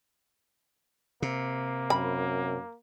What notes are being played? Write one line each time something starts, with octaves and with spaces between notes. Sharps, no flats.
C3 A#3
F#2 B5